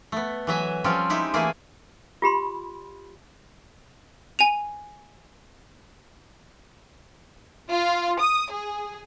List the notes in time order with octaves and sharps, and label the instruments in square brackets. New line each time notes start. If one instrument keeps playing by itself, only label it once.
[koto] A3 B3
E3 F#3 E5 G#5
F3 G3 C4 C#4 F4
G#3 D#4 E4 G4
E3 A3 A#3 E4 G#4
[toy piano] F4 G4 B5 C6
[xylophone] G#5 D#7 F7
[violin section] F4
D#6
G#4